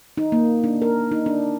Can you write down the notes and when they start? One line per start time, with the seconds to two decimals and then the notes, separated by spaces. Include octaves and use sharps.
0.18 D#4
0.32 A#3
0.64 D4
0.82 A#4
1.12 D#4
1.26 D4